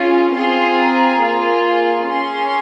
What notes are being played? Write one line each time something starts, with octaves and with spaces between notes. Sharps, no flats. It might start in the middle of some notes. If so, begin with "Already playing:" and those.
Already playing: C#4 F4 G#4
C4 F4 G#4 C6
A#5
A#3 F4 G#4
C6
C#4 G#4 C6